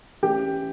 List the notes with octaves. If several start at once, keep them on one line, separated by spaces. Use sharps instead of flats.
E3 A3 C#4 G4 G5